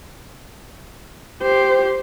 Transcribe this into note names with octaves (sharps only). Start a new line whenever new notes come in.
G4 C5